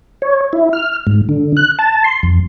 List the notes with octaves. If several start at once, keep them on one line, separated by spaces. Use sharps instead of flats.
C#5
E4
F6
G#2
D3
F#6
A5
C6
F2